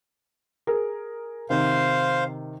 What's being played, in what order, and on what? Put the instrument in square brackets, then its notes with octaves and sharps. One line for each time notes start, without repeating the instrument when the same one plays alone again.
[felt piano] G#4 A#4
[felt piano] C3 D#3 [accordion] C5 F5